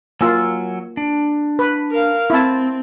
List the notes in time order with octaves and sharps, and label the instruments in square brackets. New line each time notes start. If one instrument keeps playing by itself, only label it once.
[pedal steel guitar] F#3 G#5 E6 [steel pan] A#3 F4
[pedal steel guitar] D4
[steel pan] B4
[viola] A#4 F5
[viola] C4 [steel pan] E4 A5